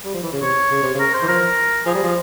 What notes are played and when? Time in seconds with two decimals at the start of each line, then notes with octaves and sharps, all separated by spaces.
0.05 G3
0.14 F3
0.23 E3
0.32 C#3
0.41 C3 C#5
0.70 C#3
0.82 C3
0.95 C#3 A#4
1.14 C5
1.22 E3
1.28 F3 A#4
1.86 F3 G#4
1.94 G3
2.03 F3